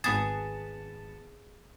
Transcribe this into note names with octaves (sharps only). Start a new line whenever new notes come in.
G#1 B3 G#4 A5